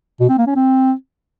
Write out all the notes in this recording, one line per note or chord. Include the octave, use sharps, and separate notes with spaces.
B2
C4
A#3
C#4
C4